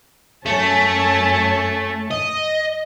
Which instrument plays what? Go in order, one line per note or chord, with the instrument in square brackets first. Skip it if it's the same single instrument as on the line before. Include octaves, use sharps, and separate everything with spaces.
[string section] F#2 C#4 A5 [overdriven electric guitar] A3
[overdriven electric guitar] D#5